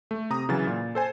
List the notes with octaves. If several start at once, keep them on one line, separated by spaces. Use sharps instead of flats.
A3
C3 A#5 D#6
C#3 E3 F#3 A6
A#2
A4 C5 G#5